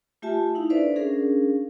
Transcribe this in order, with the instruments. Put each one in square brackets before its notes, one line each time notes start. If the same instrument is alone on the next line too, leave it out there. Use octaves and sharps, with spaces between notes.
[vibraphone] A3 F4 G4 E5 G#5 A5
D#4 E4 F5
D4 A4 B4 C5 D5 E5
C#4 D4 G#4 A#4 F5